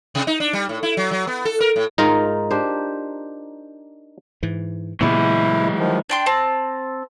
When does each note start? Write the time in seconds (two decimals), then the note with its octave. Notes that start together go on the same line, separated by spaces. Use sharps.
0.15 C3
0.27 D#4
0.40 D4
0.53 G3
0.69 A2
0.83 E4
0.97 F#3
1.11 F#3
1.27 B3
1.45 A4
1.60 A#4
1.76 A2
1.98 G#2 D#4 F4 A#4
2.51 D4 G4 C5
4.43 G#2 E3
5.01 A#2 C#3 E3 F#3 G#3 B3 E4 D5
5.79 D#3 F3
6.09 D4 G5 C6
6.26 C4 A5